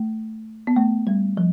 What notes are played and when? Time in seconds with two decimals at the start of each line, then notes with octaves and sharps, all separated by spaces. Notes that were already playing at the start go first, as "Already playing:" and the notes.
Already playing: A3
0.67 B3
0.76 A3
1.07 G3
1.37 F3